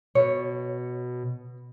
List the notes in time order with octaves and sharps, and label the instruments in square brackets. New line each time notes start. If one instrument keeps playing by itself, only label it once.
[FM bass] B2 [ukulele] C#5